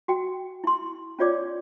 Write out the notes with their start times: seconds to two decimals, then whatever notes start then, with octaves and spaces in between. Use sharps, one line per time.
0.08 F#4 G5
0.64 E4 C6
1.19 C#4 F4 C#5 D5 D6